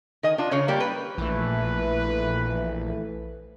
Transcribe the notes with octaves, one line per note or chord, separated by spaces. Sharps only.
D#3 D#5 G#5
D4 F4
C#3 C#5 F5
G3 A#3
B4
A#1 E3 A3 B4